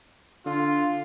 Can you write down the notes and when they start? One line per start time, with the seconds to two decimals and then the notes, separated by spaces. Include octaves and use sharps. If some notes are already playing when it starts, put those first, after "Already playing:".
0.46 D3 F4